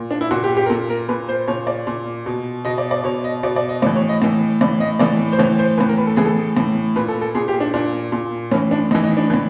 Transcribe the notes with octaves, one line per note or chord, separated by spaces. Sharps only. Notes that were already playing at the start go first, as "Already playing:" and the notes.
Already playing: A#2
D4
E4
A#2 F#4
G4
G4
A#4
A#2 A4
A#4
A#2 B4
C5
A#2 C#5
D5
A#2
B2
B2 D#5
D5
D5
B2 C#5
D#5
B2 D5
D5
D#5
A2 E3 D5
C#5
D#5
A2 E3
A2 E3 D5
D#5
A2 E3 D5
C5
A2 E3 C#5
C5
A2 E3 B4
A#4
B4
A4
A2 E3 G#4
A4
A2 E3
A#2 B4
A4
A4
A#2 G#4
G4
D4
A#2 D4
A#2
A2 E3 C#4
D4
A2 E3 D#4
D#4
D4
A2 E3